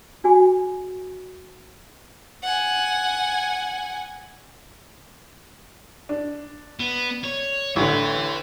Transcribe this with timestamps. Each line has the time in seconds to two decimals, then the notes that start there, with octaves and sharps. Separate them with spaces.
0.24 D4 F#4 G#4 G#5
2.43 F#5 G#5
6.09 D4
6.80 B3
7.24 C#5
7.76 A1 D3 B4 E5